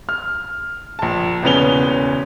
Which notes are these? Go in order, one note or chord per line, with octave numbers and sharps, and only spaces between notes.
F6
A#1 A5
E1 C#3 B3 C#4 F7 G7